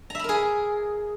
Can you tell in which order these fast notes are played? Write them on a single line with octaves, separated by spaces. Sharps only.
A#5 E5 B5 A#4 G#4